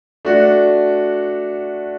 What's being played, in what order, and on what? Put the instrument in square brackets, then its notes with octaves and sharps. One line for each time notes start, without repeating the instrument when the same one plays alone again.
[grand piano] A3 D4 F#4